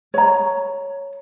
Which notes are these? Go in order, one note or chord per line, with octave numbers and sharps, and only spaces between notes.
C#5 A#5